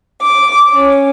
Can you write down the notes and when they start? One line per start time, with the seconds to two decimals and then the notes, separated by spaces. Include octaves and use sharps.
0.21 D6
0.72 C#4